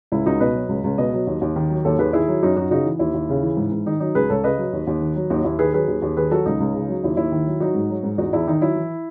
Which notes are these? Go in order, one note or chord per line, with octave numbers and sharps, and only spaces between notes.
C#2 E4
C#2 D#4 F#4
B2 B4 D#5
F#3
C#2
C#2
B2 B4 D#5
F#3
D#2
D#2
D#3
F#3
D#2 A4 C#5
D#2 G#4 B4
D#3 E4 G#4
F#3
F#2 D#4 F#4
F#2 D#4 F#4
C#3 D#4 F#4
E3
D#2 E4
D#2
C#3
E3
G#2
G#2
D#3 D#4
F#3 D#4
C#2 G#4 B4
C#2 A4 C#5
C#3 B4 D#5
F#3
D#2
D#2
D#3
F#3
D#2 D#4 F#4
D#2 E4
D#3 G#4 B4
F#3 G#4 B4
D#2
D#2
D#3 G#4 B4
F#3 F#4 A4
C#2 D#4
C#2
C#3
F#3
D#2 E4
D#2 E4
D#3
F#3
F#3 D#4 F#4
G#2
F#3
G#2
E2 D#4 F#4
E2 E4
D#3 D#4
F#3 E4
E3